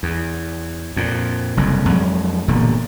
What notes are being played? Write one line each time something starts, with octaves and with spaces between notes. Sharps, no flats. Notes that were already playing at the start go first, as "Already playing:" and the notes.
E2
F2 A#2
F#1 C2 F2
F2 F#3 G#3
E1 G2 A#2 D3